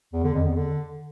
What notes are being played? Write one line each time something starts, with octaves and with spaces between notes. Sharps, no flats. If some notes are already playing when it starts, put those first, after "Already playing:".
E2
D3
F2
E2
D3